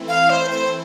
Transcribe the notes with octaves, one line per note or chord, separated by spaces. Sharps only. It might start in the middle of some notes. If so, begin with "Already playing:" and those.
Already playing: E3 A3 C4 E4
F5
C5
C5